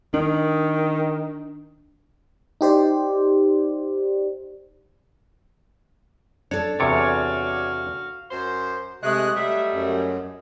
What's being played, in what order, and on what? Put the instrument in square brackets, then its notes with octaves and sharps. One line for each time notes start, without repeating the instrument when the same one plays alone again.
[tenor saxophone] D#3 [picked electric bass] D4
[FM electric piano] D#4 G4 C5 D5
[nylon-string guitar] D4 A4 [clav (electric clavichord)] C#5
[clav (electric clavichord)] E2 C3 [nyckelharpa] F#4 F5 [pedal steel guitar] C#5 D5 C#6
[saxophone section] F#2 C5
[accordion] C3 A3 F#6 [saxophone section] G#3 [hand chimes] D#5 D#6
[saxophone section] F#3 G3 A3 [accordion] E5
[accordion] F#2